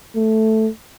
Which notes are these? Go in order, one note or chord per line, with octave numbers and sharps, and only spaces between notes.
A3